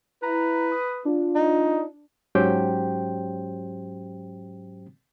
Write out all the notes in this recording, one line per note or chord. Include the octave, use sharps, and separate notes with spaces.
E4 B4 A#5
D#6
D4 F4
D#4
G#2 F#3 C#4 G4 C5 G5